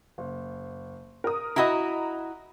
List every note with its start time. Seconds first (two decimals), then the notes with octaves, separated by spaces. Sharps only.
0.18 F#1
1.24 A#4 D#6
1.56 E4 F#4 D#5 A#5 B5